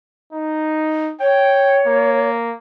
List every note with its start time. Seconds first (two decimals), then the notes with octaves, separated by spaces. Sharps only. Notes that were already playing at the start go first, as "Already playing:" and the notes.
0.32 D#4
1.20 C#5 G5
1.86 A#3